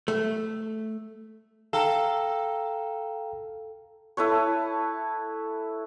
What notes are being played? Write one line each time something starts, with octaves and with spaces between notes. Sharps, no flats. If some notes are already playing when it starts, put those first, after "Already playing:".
A3
A4 F5 G5 A#5
E4 A4 B4 C#5